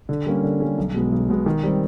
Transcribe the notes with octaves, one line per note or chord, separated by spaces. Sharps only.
D3
G3 A#3 C#4
D3
G3 A#3 C#4
B1
B2 G#3 B3
B1
B2 G#3 B3
D#3
G3 C4